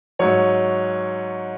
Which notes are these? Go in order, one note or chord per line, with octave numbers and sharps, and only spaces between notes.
G#2 F#3 C#5